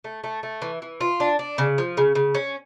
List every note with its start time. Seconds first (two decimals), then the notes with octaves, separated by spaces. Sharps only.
0.04 A3
0.24 A3
0.43 A3
0.62 E3
0.82 E3
1.01 F4
1.20 D4
1.39 D4
1.58 C#3
1.78 F3
1.97 C#3
2.15 C#3
2.35 C#4